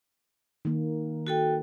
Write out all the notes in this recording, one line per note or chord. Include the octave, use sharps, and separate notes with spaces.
D#3 A#3
F#4 A4 G5